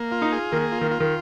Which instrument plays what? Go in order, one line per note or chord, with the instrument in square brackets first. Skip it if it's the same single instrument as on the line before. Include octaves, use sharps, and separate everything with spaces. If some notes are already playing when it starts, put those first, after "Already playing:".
Already playing: [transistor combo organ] A#3
F4
[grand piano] D#4
[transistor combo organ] G#4
[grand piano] D#3 [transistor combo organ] A#3
[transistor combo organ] F4
[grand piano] D#3
[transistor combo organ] F4
[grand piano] D#3